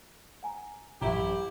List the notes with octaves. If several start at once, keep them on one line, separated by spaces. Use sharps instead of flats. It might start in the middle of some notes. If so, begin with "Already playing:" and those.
F#5 G#5 A#5
A1 F#2 A2 E4 G4 E5 A#5